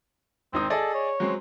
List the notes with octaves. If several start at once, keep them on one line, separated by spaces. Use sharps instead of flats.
G#1 C4 D#4 D#6
G#4 A4 D5 D#5
C#5
F#3 G#3 C4